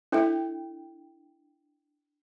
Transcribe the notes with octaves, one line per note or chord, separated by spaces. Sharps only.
D4 E4 A4 C#5 E5 G5